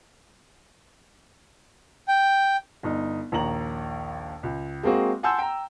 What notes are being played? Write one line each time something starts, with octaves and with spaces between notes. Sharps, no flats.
G5
G1 D#4
A#1 D#2 A#5 F#7
C#2
G#3 A#3 C4 F#4 G#4
F#5 G#5 A5 C6 E6 G6
G5 A#5